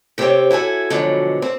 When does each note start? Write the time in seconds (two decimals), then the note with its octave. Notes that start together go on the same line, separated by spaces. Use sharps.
0.18 C3 C4 G4 A4 C#5 G5
0.51 E4 F#4 A4 G#5
0.90 B2 D3 F3 F#3 G#3
1.42 C4